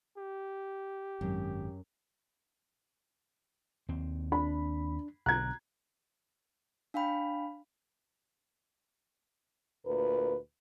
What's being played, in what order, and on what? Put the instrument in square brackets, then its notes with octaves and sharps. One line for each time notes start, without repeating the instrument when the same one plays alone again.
[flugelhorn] G4
[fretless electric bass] G#1 [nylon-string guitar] F#2
[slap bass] D#2 C4
[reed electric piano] D4 [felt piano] B5
[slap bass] B1 D3 [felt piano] A#5 G#6 [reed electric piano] F#6
[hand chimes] D4 F5 G5 B5
[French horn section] D2 A#2 A#4 B4